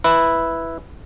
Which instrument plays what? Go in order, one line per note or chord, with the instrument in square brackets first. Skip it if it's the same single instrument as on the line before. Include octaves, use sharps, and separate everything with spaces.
[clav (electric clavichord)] E4 B4